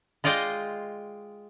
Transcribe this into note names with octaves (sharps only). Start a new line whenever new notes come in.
G#3 F4 D5 D#5 G5